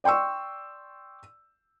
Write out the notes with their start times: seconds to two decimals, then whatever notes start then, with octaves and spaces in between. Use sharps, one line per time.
0.04 D5 G5 C6 C#6 E6